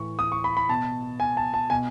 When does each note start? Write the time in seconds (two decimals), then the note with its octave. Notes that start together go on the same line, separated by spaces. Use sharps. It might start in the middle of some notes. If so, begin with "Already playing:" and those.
Already playing: A2 E3 C#6
0.19 D#6
0.32 C#6
0.44 B5
0.57 B5
0.69 B2 A5
1.20 G#5
1.37 A5
1.54 A5
1.70 B2 G#5